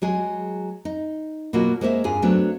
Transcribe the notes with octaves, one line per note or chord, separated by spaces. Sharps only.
F#3 G#3 G#4
D#4
B2 F#3 A#3 F4 F#4
G#3 A#3 C5 C#5 E5
G2 F4 G#4
F#3 A3 B3 C4 D4